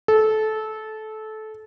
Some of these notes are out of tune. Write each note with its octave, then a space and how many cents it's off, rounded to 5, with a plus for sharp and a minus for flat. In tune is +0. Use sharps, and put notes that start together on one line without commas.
A4 -20